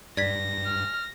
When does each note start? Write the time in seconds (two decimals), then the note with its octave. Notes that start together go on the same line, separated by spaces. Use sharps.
0.17 G2 D5 G#6 A#6 B6
0.65 F6